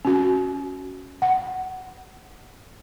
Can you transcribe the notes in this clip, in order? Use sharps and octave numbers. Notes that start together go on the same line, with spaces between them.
C#4 F#4
F#5